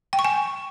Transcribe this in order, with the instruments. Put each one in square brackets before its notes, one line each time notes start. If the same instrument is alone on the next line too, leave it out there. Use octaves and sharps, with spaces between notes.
[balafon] G5
C#6
G#5